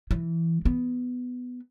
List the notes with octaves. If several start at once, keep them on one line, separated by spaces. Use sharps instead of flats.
E3
B3